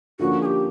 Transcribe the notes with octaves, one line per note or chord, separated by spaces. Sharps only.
D3 F3 A#3 C#4 F#4
G#4
G4